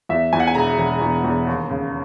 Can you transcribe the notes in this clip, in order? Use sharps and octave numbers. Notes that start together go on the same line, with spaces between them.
E2 E5
E2 G#5
F#5
G#5
E1 A#5
E1
E2
E2
D#2
C#3